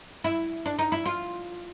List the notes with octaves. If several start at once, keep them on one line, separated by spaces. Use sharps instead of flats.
E4
D4
D#4
E4
F4